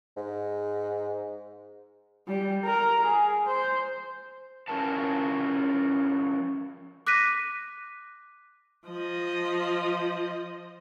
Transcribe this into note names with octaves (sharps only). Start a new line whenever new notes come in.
G#2
G3
A#4
G#4
C5
F3 C#4 E4 F#4 A#4 A5
D6 F#6 A#6 B6 D#7
F3 D#5